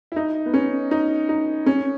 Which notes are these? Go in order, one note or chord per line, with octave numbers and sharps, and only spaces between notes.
E4
D#4
B3
C#4
D#4
D#4
C#4